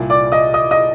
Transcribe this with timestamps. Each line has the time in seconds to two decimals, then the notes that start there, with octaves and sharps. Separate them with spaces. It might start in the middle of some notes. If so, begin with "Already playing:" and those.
Already playing: C2 A#2
0.10 D5 D6
0.32 D#5 D#6
0.54 D#5 D#6
0.71 D#5 D#6